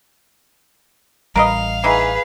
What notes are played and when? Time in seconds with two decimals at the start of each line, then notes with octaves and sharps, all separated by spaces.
1.36 A1 G3 A#4 B4 D#5 F5
1.84 E3 D#4 E4 G#4 B4